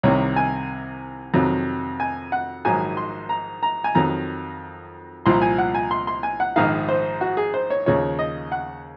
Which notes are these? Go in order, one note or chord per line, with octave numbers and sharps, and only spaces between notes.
C2 C3 D#3 C#5
G#5
F2 C3 D#3 F#3
G#5
F#5
A#1 G#2 D#3 F#3 G#5
C6
A#5
A#5
G#5
F2 D#3 F#3 A#5
C2 A#2 F3 C6
G#5
F#5
G#5
C6
C6
G#5
F#5
A#1 G#2 D#3 F5
C5
F#4
G#4
C5
C#5
D#2 C#3 F3 C#5
D#5
F#5